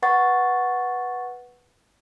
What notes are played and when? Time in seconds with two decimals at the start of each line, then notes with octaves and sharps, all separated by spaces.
0.02 B4 F#5 C#6 A6